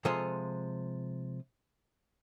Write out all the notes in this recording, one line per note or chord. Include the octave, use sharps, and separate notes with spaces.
C3 F3 G#3 A4 D#5 F5